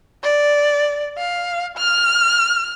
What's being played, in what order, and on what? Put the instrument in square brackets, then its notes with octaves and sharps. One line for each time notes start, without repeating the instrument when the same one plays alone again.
[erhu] D5
F5
F6